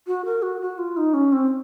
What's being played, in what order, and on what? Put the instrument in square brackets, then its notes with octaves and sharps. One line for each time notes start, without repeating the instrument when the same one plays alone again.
[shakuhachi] F#4
A#4
F#4
F#4
F4
D#4
C#4
C4